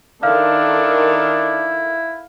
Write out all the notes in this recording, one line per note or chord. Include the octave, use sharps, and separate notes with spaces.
D#3 D4 E4 A4 A#4 F5 F6